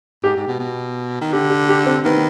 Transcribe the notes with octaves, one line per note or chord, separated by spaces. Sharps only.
G#2 G4
G#2
B2
B2
D#3
D3 G4
G4
G4
C4
D#3 B3